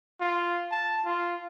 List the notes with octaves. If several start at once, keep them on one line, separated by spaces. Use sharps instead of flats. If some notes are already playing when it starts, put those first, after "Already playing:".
F4
A5
F4